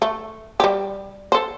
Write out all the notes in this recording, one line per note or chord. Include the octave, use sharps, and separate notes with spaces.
A3
G3 G4
A4 C5